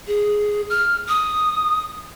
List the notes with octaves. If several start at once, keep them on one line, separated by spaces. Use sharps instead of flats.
G#4
F6
D#6